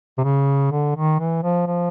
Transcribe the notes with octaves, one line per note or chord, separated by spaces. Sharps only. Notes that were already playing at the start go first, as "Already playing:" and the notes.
C3
C#3
D3
D#3
E3
F3
F3